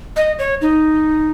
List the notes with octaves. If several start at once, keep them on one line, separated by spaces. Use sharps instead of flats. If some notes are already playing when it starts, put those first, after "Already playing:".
D#5
C#5
D#4